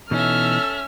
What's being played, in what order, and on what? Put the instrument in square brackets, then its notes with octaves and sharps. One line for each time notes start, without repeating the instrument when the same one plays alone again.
[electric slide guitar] B2 E3 D#4 [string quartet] C#4 E5 [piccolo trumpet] A4 [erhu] F6